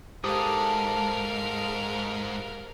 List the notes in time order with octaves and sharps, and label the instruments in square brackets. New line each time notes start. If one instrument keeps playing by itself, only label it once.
[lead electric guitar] G#2 [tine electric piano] G4 C5 [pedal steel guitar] A4 D6 D#6 [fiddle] A#4 F5